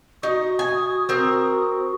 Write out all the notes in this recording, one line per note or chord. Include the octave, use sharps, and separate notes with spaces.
D#4 F#4 D#6
G#5
C4 A#4